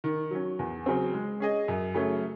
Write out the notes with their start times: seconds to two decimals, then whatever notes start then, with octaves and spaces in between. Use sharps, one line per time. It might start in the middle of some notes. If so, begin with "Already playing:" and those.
0.04 D#3
0.31 F#3 C#4
0.59 E2
0.86 C#3 F#3 C4
1.14 G#3
1.40 C#4 G#4 D#5
1.68 F#2
1.94 C#3 F#3 A3 C#4